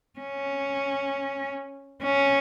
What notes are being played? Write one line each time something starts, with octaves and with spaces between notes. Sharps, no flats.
C#4
C#4